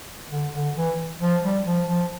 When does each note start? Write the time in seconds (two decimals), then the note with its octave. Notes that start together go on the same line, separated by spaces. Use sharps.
0.30 D3
0.53 D3
0.76 E3
1.21 F3
1.43 G3
1.66 F3
1.88 F3